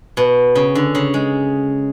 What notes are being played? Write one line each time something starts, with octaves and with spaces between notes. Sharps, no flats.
B2
C#3
D3
C#3
G#3